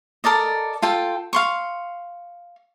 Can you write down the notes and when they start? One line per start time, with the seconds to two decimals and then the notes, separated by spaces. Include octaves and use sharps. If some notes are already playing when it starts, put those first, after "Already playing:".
0.24 A4 A#4 D5 D#5
0.82 F4 A4 G5
1.33 F5 C6 C#6